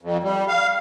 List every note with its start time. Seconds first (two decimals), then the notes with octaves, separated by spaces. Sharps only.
0.02 F2
0.23 G3
0.48 F5